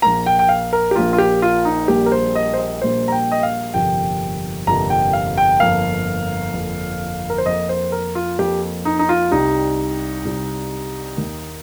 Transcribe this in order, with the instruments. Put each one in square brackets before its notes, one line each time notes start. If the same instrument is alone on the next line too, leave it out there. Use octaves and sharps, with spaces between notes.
[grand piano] A#1 A#2 A#3 A#5
G5
G5
F5
A#4
G4
A#1 A#2 A#3 F4
F4
G4
F4
D#4
A#1 A#2 G3 A#3 G4
A#4
C5
D#5
C5
D#5
A#1 A#2 G3 A#3 C5
A#5
G5
D#5
F5
G1 F2 C3 F3 A#3 G5
G1 F2 C3 F3 A#3 A#5
G5
F5
G5
G1 F2 F3 A#3 F5
G1 F2 F3 A#3
A#4
C5
F2 F3 A#3 D#5
C5
A#4
F4
F2 F3 A#3 G4
D#4
D#4
F4
C2 C3 G3 D#4
C2 C3 G3
D#2 D#3 A#3